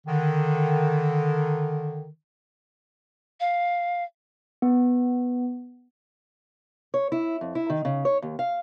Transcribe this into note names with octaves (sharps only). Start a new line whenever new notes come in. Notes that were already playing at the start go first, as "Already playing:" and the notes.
D3 D#3
F5
B3
C#5
E4
F2
E4
D#3
C#3
C#5
D#2
F5